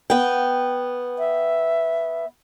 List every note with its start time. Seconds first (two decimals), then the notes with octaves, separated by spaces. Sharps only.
0.10 B3 G5
1.18 E5